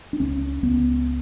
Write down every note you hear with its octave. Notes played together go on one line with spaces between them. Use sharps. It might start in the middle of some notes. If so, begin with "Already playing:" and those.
D4
C#2 C#4
C#2 B3